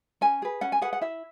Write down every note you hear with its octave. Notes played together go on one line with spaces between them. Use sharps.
C#4 G#5
G#4 B4
C#4 F#5
G#5
G#4 B4 F#5
F#5
E4 E5